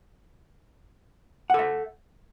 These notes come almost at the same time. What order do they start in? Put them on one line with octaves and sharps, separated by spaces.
F#5 A4 E5